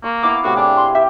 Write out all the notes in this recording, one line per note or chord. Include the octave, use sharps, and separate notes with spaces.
A#3 C#6
B3 E4 F5 D6
A2 C3 F#4
D4 G#4
C6
G4 E5